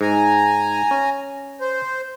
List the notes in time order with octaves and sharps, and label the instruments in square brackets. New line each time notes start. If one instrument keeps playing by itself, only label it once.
[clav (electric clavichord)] G#2 [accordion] G#5 A#5
[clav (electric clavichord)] C#4
[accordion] C5